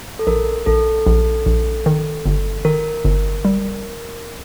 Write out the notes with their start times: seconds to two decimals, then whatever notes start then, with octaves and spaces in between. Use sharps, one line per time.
0.19 A4
0.27 A#1 A#4
0.66 A#1 A4
1.06 A#1
1.46 A#1
1.86 D#3
2.26 G1
2.65 D#3 A#4
3.05 G1
3.45 G3